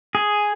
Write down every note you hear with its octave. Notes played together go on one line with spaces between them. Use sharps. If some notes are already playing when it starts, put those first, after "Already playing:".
G#4